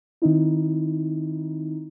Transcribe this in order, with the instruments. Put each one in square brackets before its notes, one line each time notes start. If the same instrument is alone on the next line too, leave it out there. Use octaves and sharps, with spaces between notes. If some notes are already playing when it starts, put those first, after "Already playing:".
[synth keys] D#3 C4 D#4 E4